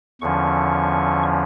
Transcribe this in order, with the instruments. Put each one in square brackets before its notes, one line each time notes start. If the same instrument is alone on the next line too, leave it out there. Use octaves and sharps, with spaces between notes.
[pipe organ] E2 D3 F3 C#4 C#6